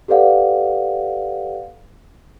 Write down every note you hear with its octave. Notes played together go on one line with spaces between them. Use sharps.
G4 A4 B4 D5 F5 F#5